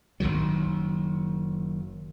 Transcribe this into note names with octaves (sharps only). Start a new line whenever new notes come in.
F#1 C2 D#3 F#3